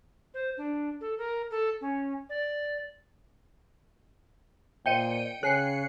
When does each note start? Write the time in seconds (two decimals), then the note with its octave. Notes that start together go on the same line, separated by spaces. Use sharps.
0.34 C5
0.57 D4
1.01 A4
1.18 A#4
1.50 A4
1.81 C#4
2.29 D5
4.86 A#2 C5 D#5 G5 C#7 D#7
5.43 C#3 G#4 C#5 F#6 C7 C#7